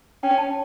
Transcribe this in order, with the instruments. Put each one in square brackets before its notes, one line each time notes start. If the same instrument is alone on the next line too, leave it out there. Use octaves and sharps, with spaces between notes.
[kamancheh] C#4 [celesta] G5
[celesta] A5